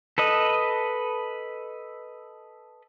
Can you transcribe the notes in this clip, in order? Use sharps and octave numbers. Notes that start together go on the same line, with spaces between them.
A4 B4 D#5